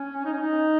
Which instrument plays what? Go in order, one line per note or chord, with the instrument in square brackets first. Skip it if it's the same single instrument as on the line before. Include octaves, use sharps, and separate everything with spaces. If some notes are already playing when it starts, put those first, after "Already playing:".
Already playing: [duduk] C#4
D#4
C#4
D#4